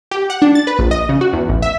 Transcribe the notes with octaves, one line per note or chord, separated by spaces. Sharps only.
G4
F#5
D4
A6
B4
A#1
D#5
C#3
F#4
E2
A1
E5